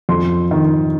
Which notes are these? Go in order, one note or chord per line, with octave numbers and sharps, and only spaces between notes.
F2 C6
D#3